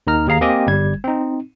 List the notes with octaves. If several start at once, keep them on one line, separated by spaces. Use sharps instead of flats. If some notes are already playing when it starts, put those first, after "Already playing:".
D#2 D#3 D#4 A#5 F6
D#2 G#4 F5 A#5 C7
A#3 C4 G4 D#5 G5 G#5
G1 G3 G#6
C4 D#4